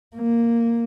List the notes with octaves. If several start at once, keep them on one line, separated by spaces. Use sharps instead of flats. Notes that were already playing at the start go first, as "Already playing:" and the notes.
A#3